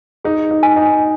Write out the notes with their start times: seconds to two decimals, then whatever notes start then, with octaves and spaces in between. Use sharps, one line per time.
0.25 D#4 G#4
0.51 D#4
0.63 G#5
0.76 D#4